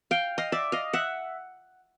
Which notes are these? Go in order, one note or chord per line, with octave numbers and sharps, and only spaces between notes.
F5 G5
D#5 F5
D5 E5
D#5 F5
E5 F#5